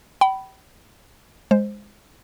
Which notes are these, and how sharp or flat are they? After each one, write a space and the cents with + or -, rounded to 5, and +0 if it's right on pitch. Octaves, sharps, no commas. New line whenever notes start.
G5 -35 B5 +0
G#3 -10 C5 +0